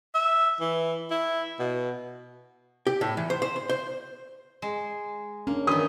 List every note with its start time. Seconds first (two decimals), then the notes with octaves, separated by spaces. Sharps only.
0.15 E5
0.60 E3
1.11 E4
1.59 B2
2.87 G4
3.01 A2
3.17 E3
3.30 C5
3.42 C5
3.56 C6
3.69 C5
4.62 G#3
5.47 A#3 C#4 D4
5.67 D#3 E3 D#6